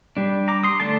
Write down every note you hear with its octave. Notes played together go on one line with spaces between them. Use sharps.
G3 D4
A#5 D6
C6 D#6
D3 A3 D4 A5 C6